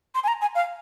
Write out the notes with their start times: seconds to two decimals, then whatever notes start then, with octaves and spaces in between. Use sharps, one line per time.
0.15 C6
0.24 G#5
0.28 A#5
0.41 G#5
0.55 F5